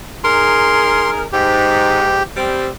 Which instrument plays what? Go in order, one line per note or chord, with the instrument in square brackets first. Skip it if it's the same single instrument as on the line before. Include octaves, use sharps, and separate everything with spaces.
[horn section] D#4 G#4 A#4 [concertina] C6
[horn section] G#2 [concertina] G4
[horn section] G3 C4